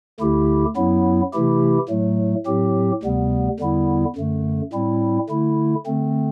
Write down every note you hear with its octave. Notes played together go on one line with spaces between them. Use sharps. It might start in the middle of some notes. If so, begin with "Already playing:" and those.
D2 D3 A3 E4 G4
F#2 F#3 B3 E4
C3 E3 A3 E4 G4
A2 F#3 A3
A2 F#3 C4 G4
D2 C3 G3 B3
E2 D3 G3 B3 E4
F#2 D3 A3
A2 G3 C4 E4
D3 A3 E4
D3 A3 C4